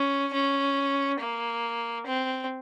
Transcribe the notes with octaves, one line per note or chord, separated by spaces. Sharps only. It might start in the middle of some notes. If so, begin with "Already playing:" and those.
Already playing: C#4
C#4
A#3
C4